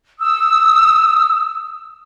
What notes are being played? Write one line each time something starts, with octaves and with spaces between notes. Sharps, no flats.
D#6 E6